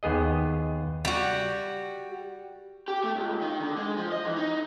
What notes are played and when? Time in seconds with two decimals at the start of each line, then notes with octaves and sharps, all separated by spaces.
0.03 D#2 B3 G#4 D#5
1.05 G3 F#4
2.88 G4
3.04 A3
3.16 C#2
3.41 D#3
3.60 D3
3.77 G#3
3.97 F3
4.12 D#5
4.25 E3
4.37 D#4